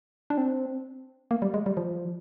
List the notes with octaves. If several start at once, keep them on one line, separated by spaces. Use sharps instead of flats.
D4
C4
A#3
G3
G#3
G3
F3